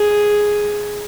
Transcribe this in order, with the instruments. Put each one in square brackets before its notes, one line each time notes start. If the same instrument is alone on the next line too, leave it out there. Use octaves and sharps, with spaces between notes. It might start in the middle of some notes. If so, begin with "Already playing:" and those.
Already playing: [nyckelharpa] G#4